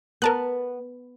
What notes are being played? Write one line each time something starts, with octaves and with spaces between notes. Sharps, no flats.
B3 A#4 A5 F#6